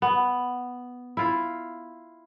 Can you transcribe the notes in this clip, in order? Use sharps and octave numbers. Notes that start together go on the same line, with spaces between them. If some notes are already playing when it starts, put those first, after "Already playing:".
B3
E4 F4